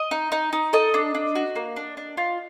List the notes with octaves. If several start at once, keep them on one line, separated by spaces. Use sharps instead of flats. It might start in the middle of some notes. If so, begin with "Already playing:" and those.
Already playing: D#5
D#4
D#4
D#4
A4 D#5
D4
D4
F#4
A#3
D4
D4
F4